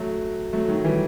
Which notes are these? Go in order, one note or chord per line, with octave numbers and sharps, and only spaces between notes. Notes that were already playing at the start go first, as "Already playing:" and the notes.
Already playing: F#3 A3
F#3 A3
D#3 F#3
E3 G3